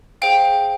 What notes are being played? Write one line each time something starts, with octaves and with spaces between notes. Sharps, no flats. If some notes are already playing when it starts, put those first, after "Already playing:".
G#4 C5 F5 G5